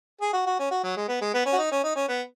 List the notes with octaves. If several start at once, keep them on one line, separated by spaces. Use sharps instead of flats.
G#4
F#4
F#4
C#4
F#4
F#3
G#3
B3
G#3
B3
C#4
F#4
D#4
C#4
D#4
C#4
B3